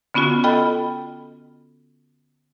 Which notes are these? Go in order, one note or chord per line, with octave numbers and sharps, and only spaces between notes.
D3 B3 C#4 F4 F#4
F4 A4 D#5 G5 B5